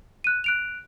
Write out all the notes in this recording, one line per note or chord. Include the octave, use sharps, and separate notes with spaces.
F#6 D#7
F#6 D7 F7